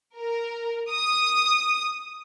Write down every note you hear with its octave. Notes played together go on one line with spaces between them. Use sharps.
A#4
D#6